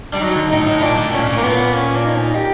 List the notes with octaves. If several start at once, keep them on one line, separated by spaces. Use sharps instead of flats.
G3 D4
F#3 D#4
D3
A2 D#4
A2
A#2 D4
A2
A#2 C#4
A2
A#3
A#2 B3
C#4
D4
D#4
G4